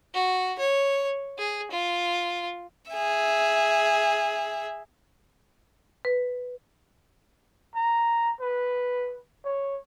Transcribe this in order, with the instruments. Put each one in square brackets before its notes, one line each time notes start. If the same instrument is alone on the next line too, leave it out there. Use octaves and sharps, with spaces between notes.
[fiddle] F#4
C#5
G#4
F4
[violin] G#4 E5
[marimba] B4
[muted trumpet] A#5
B4
C#5